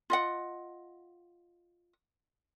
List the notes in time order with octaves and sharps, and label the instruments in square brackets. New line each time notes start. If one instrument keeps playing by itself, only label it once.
[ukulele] F4 D#5 F#5